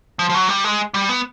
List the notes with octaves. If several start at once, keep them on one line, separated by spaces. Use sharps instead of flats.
F3
F3
F#3
G3
G#3
G3
B3